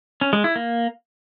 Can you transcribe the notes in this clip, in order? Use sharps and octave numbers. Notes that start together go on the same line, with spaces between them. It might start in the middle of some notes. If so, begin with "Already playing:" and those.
C#4
G#3
E4
A#3